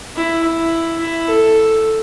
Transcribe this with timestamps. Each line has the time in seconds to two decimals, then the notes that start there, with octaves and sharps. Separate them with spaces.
0.16 E4
0.44 E4
1.00 E4
1.28 A4